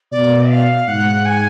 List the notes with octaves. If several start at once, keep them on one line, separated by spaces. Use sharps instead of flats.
B2 D5
F5
G#2 F#5
G#5